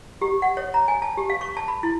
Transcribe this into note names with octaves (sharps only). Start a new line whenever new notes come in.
G4
F#5
C#5
A#5
G#5
A5
G4
F5
C#6
A5
B5
E4